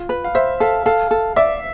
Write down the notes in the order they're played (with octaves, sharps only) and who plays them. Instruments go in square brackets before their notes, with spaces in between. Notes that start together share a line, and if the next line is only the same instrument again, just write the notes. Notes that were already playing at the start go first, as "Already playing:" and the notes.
Already playing: [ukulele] F4
B4
[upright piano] F5
[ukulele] C5 [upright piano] E5
[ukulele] A4 [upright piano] F5
[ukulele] A4 [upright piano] F5
[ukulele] A4
[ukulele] D5 [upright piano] E5